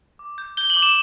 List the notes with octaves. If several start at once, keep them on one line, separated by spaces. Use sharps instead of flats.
D6
G6
G6 G7
F#7
D6
E7